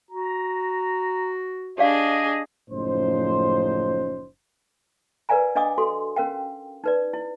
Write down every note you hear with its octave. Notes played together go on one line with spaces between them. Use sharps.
F#4 A#5
D4 G4 G#4 D5 D#5 F5
F#1 A2 F3 C#4 D#4 C5
A#4 B4 D5 F5 G#5 A#5
D4 D#5 F5 G#5 D6 D#6
F#4 A4 C6
C#4 A#4 F5 G5
D#4 B4 D5
E4